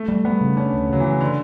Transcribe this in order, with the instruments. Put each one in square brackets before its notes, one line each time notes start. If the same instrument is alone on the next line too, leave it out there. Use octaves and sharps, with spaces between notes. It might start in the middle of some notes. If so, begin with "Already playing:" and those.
Already playing: [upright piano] A3
[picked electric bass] G3
[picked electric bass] G3 [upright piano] B3
[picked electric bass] C#3
[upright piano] C#4 [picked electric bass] D4
[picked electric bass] D2
[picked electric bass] C#3 [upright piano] F#3
[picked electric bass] C#3 [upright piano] E3
[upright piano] D3